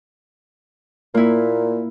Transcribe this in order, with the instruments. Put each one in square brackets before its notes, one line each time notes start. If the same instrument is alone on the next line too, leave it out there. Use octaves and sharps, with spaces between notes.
[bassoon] A#2 [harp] A#3 E4